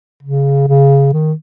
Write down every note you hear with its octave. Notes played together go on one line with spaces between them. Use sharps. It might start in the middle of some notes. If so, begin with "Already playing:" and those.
C#3
C#3
D#3